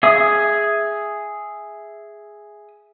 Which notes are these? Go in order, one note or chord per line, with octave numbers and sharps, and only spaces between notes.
G#4 E5 D#6